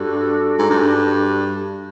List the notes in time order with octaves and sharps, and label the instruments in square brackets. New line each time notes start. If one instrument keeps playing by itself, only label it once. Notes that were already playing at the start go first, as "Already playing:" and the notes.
Already playing: [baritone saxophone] G2 [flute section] D4 F#4 A4
[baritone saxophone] G#2
G2